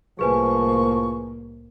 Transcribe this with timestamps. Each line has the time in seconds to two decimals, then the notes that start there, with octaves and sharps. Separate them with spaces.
0.19 C2 A2 F3 A#3 G#4 B4 G#5 C#6